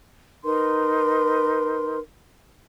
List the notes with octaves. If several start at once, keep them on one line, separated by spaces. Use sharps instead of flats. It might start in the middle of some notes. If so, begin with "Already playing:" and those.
D#4 A#4 B4 C6